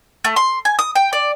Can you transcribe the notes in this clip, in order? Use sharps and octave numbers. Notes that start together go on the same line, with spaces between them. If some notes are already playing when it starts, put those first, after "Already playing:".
A3
C6
G#5
D#6
G5
D5